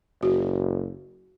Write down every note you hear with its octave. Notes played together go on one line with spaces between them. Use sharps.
F#1 F#4